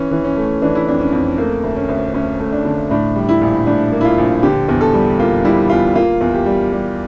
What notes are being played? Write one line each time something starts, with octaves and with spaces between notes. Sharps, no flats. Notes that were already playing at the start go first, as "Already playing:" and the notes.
Already playing: E3 C#4
E3
C#4
A3
E3 D4
E4
F2 D4
C#4
F2
A3 A#3
D2
C#4
D2
D2 C#4
A3
D4
D3
A2 D4
G3
E4
A#1
A2 D4
A#3
E4
F4
A#1
D3 G4
E2
A4
G3
A#3 F4
G3 E4
E2 F4
A#3 F4
E2
G4
G3
G3